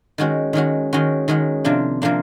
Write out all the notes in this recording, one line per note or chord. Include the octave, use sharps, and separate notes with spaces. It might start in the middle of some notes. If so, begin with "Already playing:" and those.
D#3 G#3 C#4 F#4
D#3 G#3 C#4 F#4
D#3 G#3 C#4 F#4
D#3 G#3 C#4 F#4
C3 F3 A#3 D4
C3 F3 A#3 D4